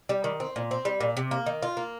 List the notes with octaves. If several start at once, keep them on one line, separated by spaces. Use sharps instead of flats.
G3
D#3
C4
A#2
C4
G3
A#2
C3
A#3
D#3
F4
A#3